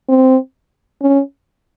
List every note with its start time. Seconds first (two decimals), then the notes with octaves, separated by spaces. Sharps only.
0.09 C4
1.01 C#4